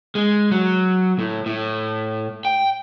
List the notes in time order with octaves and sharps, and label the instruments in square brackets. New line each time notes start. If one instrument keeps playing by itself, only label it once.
[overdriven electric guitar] G#3
F#3
A2
A2
G5